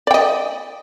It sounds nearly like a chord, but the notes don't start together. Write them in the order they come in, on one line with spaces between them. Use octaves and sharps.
D5 G5 D#5